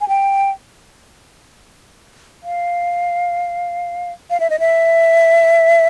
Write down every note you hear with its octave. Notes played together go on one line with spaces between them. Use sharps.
G#5
G5
F5
F5
E5
D#5
E5